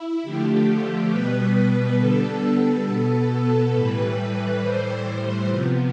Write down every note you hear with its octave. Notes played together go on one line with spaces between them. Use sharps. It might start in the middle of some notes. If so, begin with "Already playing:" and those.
Already playing: E4
D3 F3 A3 G4
B2 G3 B3 B4
D3 G3 B3 A4
B2 B3
A4
A2 E3 G3 B4
A2 E3 G3 C5
C3 F3 B3